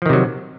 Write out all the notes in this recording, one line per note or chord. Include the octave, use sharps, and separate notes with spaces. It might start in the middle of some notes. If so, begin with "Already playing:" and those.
C3 D#3 F3 F#3